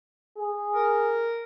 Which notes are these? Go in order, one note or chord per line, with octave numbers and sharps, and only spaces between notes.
G#4
A#4